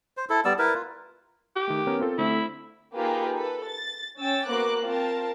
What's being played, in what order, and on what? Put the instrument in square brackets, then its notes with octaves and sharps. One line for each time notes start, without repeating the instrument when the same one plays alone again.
[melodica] C5
E4 A4
G3 B3 D5 E6
E4 A#4 B4
F4
[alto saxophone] G4
[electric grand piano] D#3 A3
B3 C#4 A#4
C4 F4 A4
[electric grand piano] D3 A3 C4 [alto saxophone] E4
[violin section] A#3 D#4 F4 G4 G#4 B4
A4 B4
A6
C#4 G5 E6 A6
A#3 B3 F#4 C5 D6 F#6
C4 F4 A#4 G5 A5